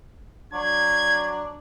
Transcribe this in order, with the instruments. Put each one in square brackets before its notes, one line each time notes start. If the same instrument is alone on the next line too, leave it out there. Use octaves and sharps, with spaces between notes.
[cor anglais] F#3 [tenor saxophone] D4 [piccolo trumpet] G#6